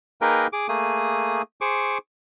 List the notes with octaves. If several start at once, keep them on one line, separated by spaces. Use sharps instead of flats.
A#3 D#4 G#4 A#4 B4 G5
G#4 D6
A3 A#3 G#4 D#6
G#4 C5 C#6 D6